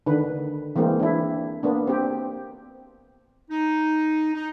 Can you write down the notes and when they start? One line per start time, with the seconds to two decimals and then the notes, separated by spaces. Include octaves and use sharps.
0.06 D3 D#3 B4
0.76 E3 G#3 A#3 C4
1.00 D4 E4
1.63 A#3 B3 D4
1.87 C4 G4
3.50 D#4
4.35 D#4